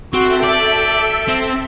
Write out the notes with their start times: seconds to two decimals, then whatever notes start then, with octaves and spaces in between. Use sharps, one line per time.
0.13 C4 F#4 A4 E5
0.43 D5 G5
1.28 C4